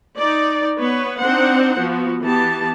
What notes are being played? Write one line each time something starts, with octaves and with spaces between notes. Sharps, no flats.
D#4 D5
B3 B4 C#5
C4 D4 D#4 C5 F#5
F3 B3 F#4
E3 B3 G4 A5